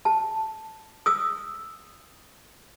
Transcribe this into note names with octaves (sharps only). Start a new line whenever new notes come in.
A5
D#6 E6